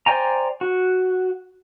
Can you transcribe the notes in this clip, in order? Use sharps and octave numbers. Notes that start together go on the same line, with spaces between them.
C5 D5 G5 G#5 A#5
F#4